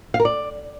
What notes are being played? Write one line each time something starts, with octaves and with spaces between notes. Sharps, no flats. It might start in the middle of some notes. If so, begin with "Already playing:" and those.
F5
A#4
D5